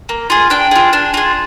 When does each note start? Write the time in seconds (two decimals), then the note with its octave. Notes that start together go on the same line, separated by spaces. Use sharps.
0.09 A#3
0.30 F4 G#4
0.50 D4 G5
0.71 F4 G#4
0.93 D4
1.14 F4 G#4